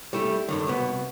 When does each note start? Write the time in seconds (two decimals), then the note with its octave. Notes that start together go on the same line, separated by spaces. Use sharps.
0.13 G3 A3 E4
0.49 G2 D3 D#3
0.67 C2 B2 B3